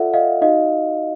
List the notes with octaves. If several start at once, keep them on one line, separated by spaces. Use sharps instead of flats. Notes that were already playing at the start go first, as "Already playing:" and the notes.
Already playing: F4 A4 D5 E5 F#5
D#5 F5
D#4 F#4 D#5 F5